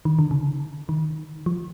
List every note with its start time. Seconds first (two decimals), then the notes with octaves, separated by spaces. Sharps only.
0.05 D#3
0.19 D3
0.31 C#3
0.89 D#3
1.46 F3